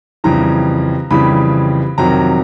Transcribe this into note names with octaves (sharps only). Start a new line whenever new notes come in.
F2 C#3 E3 G3 A#5
F2 C#3 E3 G3 B5
F2 C3 D#3 F#3 A#5